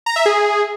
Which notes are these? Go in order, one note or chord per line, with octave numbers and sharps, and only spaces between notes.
A#5
E5
G#4